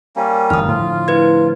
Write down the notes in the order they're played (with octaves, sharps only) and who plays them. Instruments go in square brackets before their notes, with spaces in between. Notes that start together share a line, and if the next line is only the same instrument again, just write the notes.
[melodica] G3 A#3 C#4
[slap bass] G1 E2 G#2 [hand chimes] D#6 F6
[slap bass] A2 D3 F3 [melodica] F4
[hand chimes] E4 B4 G#6